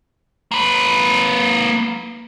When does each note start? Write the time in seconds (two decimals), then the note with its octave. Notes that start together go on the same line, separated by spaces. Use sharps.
0.51 A#3 B4